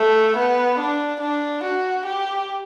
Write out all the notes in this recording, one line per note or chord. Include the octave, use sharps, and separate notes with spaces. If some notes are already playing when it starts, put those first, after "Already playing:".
Already playing: A3
B3
D4
D4
F#4
G4